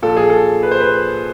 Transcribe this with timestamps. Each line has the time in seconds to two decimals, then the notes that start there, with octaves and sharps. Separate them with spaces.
0.02 A#2 F3 A4
0.17 G#4
0.30 A4
0.63 B4
0.71 C5
0.80 B4